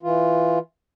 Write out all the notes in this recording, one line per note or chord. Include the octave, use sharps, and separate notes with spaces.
E3 F4